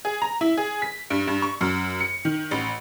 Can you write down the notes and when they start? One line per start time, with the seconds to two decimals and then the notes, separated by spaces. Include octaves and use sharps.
0.05 G#4
0.22 A#5
0.41 E4
0.57 G#4
0.82 B6
1.10 G2
1.27 G2
1.42 C#6
1.61 F#2
2.00 C#7
2.25 D#3
2.51 A1